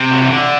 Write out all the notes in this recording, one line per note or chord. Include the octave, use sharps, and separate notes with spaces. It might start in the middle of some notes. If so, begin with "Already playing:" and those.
Already playing: C3
F#3
E3
D3